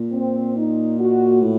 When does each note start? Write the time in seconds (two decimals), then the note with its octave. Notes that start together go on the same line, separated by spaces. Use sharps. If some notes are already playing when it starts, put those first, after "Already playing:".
Already playing: A#2
0.12 C4
0.56 D#4
0.99 F#4
1.42 A2